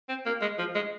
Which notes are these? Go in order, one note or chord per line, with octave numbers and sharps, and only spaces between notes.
C4
A#3
G#3
F3
G#3